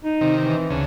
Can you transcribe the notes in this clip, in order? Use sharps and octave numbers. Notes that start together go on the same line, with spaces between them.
D#4
C3 D#3
E3
D2 C#3